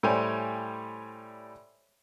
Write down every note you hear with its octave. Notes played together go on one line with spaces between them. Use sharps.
A2 G3 C5 C#5 G5 G#5